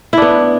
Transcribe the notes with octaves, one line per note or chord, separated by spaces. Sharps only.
B3 D4 E4